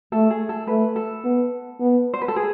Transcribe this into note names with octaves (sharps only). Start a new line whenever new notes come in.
A3 A4
G#4
A4
A3 B4
A4
B3
B3
C5
B4
A4
G#4